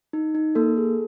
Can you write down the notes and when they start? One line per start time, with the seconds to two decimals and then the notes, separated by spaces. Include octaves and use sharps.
0.13 D#4
0.35 D#4
0.55 A#3 A4
0.77 G#4